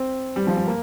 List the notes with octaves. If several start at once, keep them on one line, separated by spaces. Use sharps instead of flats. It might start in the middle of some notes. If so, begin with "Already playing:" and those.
Already playing: C4
G3
F3
G3
A#3